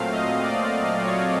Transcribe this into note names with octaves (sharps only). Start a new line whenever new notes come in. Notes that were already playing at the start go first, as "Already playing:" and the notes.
Already playing: A#2 F#3 A3 C4 F5
D#5
D5
C#5